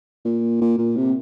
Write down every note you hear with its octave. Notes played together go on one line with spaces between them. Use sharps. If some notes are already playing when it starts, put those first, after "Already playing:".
A#2
A#2
A#2
C3